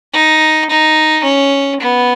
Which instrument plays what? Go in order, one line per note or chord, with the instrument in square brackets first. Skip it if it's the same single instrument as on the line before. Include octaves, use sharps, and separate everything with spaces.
[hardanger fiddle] D#4
D#4
C#4
B3